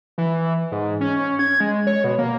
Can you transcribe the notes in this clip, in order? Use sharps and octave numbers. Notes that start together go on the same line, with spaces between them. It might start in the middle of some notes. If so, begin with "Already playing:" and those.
E3
G#2
C#4
G#6
G#3
C#5
B2
A#3